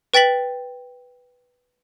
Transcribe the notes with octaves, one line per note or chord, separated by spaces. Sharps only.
B4 G5 A6 B6 F#7